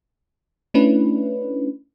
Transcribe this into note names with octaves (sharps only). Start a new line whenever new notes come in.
A3 C#4 D4 E4 B4